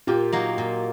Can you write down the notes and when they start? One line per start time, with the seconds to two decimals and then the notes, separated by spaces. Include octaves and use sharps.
0.07 A#2 F4 G4
0.33 F#3 A#3 D#4
0.58 A#2